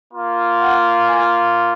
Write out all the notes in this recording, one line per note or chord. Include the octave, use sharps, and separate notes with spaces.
A#3 F4
F#5
G#5